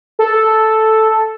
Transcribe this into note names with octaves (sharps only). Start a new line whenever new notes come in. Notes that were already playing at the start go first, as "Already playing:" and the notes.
A4